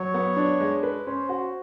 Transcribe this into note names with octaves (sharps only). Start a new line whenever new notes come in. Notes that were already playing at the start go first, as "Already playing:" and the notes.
Already playing: F#3 C#5
B3
D4
G#3
B4
C#4 C5
F#4